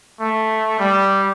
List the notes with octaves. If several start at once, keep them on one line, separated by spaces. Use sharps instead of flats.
A3
G3